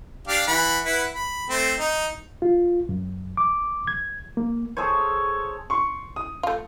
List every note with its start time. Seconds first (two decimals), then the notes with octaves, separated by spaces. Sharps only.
0.27 D4 G4 F5
0.48 E3 F#5 B5
0.85 E4 B4 F#5
1.13 B5
1.50 A3 C4
1.79 D#4
2.42 F4
2.89 F#2
3.37 D6
3.87 G#6
4.37 A#3
4.77 G#4 A4 C5 C#5
5.70 C6 C#6
6.16 D#6
6.43 A3 F4